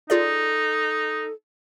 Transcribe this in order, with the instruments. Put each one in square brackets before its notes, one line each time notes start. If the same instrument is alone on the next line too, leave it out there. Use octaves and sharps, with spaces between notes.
[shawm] D#4 [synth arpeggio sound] F4 G#4 D5 [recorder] A4